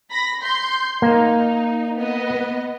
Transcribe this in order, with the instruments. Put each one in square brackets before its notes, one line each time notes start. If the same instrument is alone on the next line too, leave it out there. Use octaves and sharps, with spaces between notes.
[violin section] B5 A#6
C6 G6
[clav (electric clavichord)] A#3 [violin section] D#4
[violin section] B3 D#5